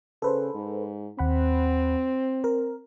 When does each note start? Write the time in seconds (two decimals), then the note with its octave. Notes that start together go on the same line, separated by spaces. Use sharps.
0.22 C#3 A4 B4 C5
0.54 G#2
1.19 D#2 C4 F#5 B5
2.44 A#4